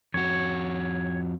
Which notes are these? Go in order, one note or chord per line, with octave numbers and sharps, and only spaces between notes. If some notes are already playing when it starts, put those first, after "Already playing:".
F2 F#4 C#5